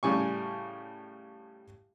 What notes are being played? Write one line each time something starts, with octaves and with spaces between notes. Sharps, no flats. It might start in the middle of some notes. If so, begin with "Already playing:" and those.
A2 C#3 G3 G#5 C#6